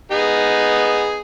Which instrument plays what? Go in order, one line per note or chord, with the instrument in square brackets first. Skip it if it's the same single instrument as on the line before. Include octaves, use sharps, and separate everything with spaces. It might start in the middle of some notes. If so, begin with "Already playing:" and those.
[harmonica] B3 D#4 G#4